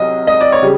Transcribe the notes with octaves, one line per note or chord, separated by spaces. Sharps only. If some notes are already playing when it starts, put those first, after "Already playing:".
Already playing: C2 F#3 D#5
D#5
D5
C#5
C#3 G3